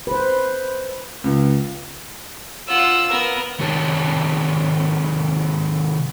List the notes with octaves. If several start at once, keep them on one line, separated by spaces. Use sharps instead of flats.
B4 C5
C#2
F4 F#5 E6
B3 A#4
C3 D#3 G#4 C#5 A5